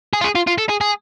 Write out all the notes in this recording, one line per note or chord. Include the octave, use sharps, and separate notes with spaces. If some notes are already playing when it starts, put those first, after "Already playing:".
G#4
F4
G#4
F4
F4
A4
G#4
G#4